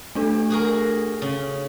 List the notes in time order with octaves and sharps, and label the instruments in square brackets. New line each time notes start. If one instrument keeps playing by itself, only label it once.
[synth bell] A3 D4 A4
[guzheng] F#4 G#4 A#4
C#3